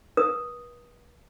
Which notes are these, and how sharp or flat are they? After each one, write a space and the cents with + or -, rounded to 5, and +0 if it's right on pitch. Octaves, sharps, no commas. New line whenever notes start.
B4 -40 D#6 +0